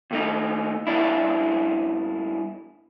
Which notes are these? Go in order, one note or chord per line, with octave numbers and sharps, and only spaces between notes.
D#2 A3 D#4
E2 G2 D4 E4